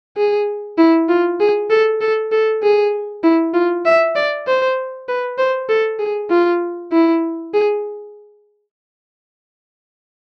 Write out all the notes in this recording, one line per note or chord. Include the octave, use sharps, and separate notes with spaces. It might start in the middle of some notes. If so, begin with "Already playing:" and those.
G#4
E4
F4
G#4
A4
A4
A4
G#4
E4
F4
E5
D5
C5
B4
C5
A4
G#4
F4
E4
G#4